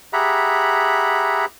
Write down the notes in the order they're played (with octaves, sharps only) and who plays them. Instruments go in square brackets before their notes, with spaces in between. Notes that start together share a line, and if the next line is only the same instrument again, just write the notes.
[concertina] G4 G#4 E5 F#5 A#5 B5